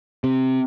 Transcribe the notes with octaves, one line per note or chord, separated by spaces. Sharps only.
C3